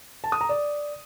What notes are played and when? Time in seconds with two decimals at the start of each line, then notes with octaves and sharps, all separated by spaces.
0.24 A5
0.32 D#6
0.41 A#5
0.49 D5